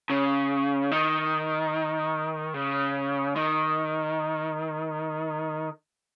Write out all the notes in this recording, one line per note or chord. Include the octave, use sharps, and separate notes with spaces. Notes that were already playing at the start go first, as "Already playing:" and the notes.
C#3
D#3
C#3
D#3